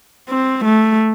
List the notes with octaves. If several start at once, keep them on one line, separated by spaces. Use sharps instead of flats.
C4
A3